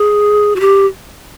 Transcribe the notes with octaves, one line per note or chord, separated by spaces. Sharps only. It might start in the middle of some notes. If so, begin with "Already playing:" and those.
Already playing: G#4
F#4
G4